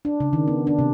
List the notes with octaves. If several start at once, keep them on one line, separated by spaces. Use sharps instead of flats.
D4
C#3
D#3
B3
D4
C3